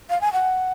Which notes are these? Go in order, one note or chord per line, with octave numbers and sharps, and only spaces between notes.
F5
G#5
F#5